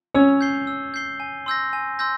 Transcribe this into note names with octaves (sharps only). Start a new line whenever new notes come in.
C#4 C#5 E6
G6 C7 G7
E6
G6 C7 G7
G#5
C6 E6 G6 A#6
G#5
C6 E6 G6 A#6